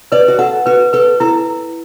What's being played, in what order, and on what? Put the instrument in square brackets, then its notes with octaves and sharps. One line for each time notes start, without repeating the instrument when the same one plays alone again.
[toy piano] B4 [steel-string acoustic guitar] D5
[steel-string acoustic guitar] F#4
[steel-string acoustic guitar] A4 [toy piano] F#5
[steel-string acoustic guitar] F#4 [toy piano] B4
[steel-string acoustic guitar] A4 [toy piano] B4
[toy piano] E4 [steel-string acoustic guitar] A4